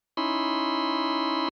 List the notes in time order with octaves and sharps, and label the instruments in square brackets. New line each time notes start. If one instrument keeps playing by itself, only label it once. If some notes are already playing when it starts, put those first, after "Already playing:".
[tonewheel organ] C#4 D#4 E4 B5 C6